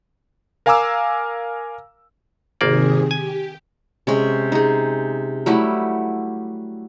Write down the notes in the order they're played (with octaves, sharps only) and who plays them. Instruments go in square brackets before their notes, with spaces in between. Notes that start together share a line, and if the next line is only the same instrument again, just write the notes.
[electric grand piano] A#4 F5 G#5 A#5 D6 E6
[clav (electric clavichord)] G#1 A#3 D5 [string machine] C3 D#3 G#4
[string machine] G4 [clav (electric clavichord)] G#5
[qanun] C3 G#3 C#4
D#4 G#4
F#3 G3 A3 E4